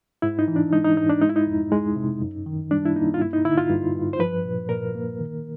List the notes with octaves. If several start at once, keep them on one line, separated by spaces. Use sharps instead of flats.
G#2 E4
D#4
E3
D4
G#3 D#4
D#4
G#2 D#4
D4
G#3 D#4
E4
D#4
F2
G#3
C3
F#2
D#3
G3 D4
E4
A#3 D#4
F4
G2 E4
D#4
D3 E4
F4
G2
G2
C5
F3 B4
A#2
A#2 A#4
A#3
D#3